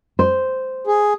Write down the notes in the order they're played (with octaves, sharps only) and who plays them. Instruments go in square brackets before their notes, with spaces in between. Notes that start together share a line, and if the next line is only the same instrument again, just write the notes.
[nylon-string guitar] C5
[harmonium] G#4